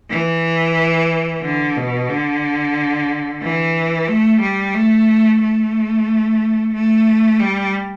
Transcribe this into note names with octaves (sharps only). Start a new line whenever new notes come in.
E3
D3
B2
D3
E3
A3
G3
A3
A3
A3
G3